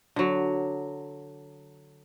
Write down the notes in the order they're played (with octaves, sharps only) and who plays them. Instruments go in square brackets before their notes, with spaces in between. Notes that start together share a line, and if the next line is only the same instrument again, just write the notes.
[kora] D3 F#3